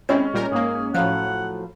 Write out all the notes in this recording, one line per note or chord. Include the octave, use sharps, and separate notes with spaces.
G#3 C4 C#4 E4
A#2 G3 A#4
G#2 A#3 G#4
A2 F3 F#3 F5 F#5